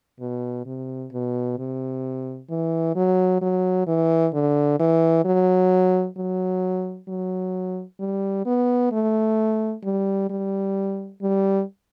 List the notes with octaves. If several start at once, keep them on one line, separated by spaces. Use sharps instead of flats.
B2
C3
B2
C3
E3
F#3
F#3
E3
D3
E3
F#3
F#3
F#3
G3
B3
A3
G3
G3
G3